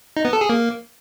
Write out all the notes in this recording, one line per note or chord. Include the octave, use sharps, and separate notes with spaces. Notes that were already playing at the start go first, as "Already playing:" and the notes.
D#4
B3
A4
G#4
A#3